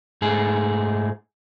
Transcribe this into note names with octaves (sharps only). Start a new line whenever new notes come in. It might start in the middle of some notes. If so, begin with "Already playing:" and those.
G#2 A3 G#4